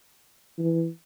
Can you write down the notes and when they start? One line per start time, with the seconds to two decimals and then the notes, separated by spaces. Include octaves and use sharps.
0.58 E3